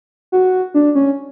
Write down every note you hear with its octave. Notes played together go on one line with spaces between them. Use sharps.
F#4
D4
C#4